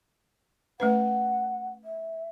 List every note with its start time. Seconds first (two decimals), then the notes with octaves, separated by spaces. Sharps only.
0.80 A3 C#4 B4 F#5
1.84 E5